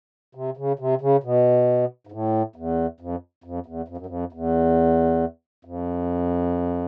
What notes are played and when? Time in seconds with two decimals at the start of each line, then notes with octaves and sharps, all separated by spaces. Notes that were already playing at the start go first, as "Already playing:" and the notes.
0.35 C3
0.57 C#3
0.79 C3
1.01 C#3
1.23 B2
2.07 G#2
2.12 A2
2.56 E2
3.00 F2
3.44 F2
3.66 E2
3.88 F2
3.97 F#2
4.06 F2
4.32 E2
5.65 F2